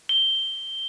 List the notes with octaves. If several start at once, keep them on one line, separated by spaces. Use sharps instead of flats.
G7